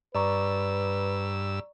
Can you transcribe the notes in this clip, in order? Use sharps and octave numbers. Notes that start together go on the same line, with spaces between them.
G2 B4 D5 A#5 C#6 E6